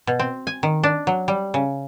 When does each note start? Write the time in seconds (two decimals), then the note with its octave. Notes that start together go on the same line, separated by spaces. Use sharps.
0.07 B2
0.19 C4
0.47 G#5
0.63 D#3
0.83 D4
1.07 F#3
1.28 G3
1.54 C#3